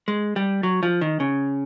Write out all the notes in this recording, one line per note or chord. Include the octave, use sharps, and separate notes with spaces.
G#3
G3
F#3
F3
D#3
C#3